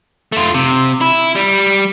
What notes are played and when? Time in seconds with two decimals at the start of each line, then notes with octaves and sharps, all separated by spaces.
0.32 A3 F4
0.54 C3
1.01 E4
1.35 G3